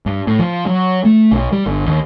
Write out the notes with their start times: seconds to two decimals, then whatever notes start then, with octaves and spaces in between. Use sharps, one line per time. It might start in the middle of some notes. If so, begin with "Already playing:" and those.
0.06 G2
0.27 A2
0.39 F3
0.66 F#3
1.05 A3
1.32 B1
1.52 G3
1.66 G1
1.86 D#2